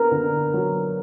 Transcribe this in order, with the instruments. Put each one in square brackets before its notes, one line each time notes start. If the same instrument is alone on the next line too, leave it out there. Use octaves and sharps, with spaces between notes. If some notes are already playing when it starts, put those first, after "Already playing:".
Already playing: [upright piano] B3 D4 [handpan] A#4
[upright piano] D3
F#3